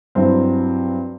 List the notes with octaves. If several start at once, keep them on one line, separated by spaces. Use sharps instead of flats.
G2 F#3 C4 E4